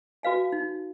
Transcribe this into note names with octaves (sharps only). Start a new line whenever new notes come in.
F#4 B4 F5 G#5
D#4